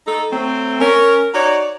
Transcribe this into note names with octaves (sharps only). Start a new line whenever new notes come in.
D#4 A4
F#3 A3 C4
C#4 A#4
D#4 F#4 C#5 D5